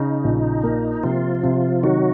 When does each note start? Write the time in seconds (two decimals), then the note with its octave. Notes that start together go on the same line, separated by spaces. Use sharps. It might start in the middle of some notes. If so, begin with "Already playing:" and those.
Already playing: C#3 D#4
0.24 A#1
0.63 A#3
1.03 C3 F3 F4
1.43 C3
1.83 D#3 F#3 F#4